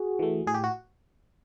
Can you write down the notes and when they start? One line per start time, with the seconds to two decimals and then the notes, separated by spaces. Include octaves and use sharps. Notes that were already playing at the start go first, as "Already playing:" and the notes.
Already playing: F#4 G#4
0.19 E3 A3
0.47 A2 G#4
0.54 G4
0.64 F#4